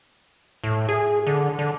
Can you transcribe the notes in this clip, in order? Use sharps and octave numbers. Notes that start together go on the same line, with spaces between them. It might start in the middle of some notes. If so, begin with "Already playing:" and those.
A2
G#4
D3
D3